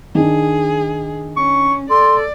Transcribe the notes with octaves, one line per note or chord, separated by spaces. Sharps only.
D#3 D4 G#4
C#4 C#6
A4 D5 C6